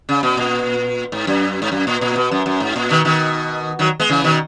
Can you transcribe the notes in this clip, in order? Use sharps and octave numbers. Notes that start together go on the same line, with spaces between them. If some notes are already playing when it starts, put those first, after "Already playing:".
C#3
B2
A#2
G#2
F#2
G#2
F#2
A#2
A#2
B2
F#2
F#2
G#2
A#2
B2 D#3
B2 D#3
D#3 F#3
G#3 B3
C#3 E3
B2 D#3